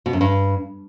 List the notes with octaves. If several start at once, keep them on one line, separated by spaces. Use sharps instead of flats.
B2
F#2
G2